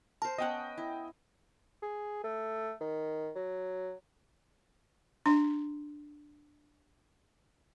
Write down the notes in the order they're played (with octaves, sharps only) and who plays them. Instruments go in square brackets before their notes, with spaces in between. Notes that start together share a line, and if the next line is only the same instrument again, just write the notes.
[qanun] A#4 C5 [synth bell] A5
[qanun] B3 C#4 F#5 [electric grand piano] D#5 G5
[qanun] E4
[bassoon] G#4
A3
D#3
F#3
[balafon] D4 C6